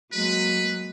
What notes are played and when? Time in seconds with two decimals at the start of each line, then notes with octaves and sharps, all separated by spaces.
0.13 F#3 G#3 A#3 B4